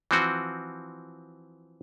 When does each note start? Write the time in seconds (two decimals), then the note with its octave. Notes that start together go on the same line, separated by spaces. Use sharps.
0.11 E3 F3 C4 F#4